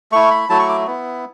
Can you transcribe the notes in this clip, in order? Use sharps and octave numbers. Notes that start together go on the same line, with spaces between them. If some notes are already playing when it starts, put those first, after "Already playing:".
A3 E4 C#6
B5
F#3 A3 E4 A5
C#6
D6
B3 E4